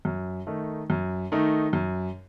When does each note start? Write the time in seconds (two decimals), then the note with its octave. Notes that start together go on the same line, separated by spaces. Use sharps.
0.05 F#2
0.47 D#3 A3 D#4
0.90 F#2
1.32 D#3 A3 D#4
1.73 F#2